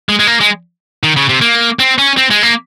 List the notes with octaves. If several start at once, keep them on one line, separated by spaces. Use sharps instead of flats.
G#3
G#3
A#3
G#3
D#3
C#3
C3
A#3
C4
C#4
C4
G#3
A#3